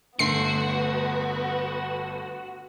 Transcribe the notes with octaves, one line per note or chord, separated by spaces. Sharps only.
G1 A3 B3 F#4 B4 C6 C7